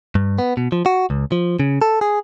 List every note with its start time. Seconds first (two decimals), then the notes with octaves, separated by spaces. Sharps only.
0.15 G2
0.38 B3
0.57 B2
0.72 F3
0.86 F#4
1.10 C#2
1.32 F3
1.60 C#3
1.82 A4
2.01 G#4